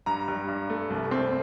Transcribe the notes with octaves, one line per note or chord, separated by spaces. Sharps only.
G2 A#5
G2
G2
A3
C2
C4